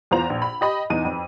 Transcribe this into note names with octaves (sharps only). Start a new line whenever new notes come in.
E2 F4 C5 A#5 F7
A#1
B5
G4 D#5 B5
E2 D#4 D#7
F2